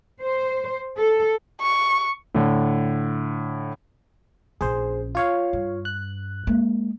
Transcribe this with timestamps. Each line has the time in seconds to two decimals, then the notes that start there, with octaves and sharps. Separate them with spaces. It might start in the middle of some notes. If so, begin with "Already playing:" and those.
0.22 C5
0.97 A4
1.61 C#6
2.35 A2 D3
4.61 A#1 C#4 G#4 C5
5.15 F4 C#5 F5
5.53 G2
5.85 F#6
6.47 G#3 A#3